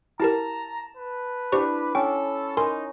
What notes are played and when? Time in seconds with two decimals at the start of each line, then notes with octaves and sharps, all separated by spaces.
0.20 E4 G4 A#4 A5 A#5
0.97 B4
1.52 D4 E4 G4 C5 C#6
1.95 C#4 A4 G5
2.57 D#4 A#4 G#5 C6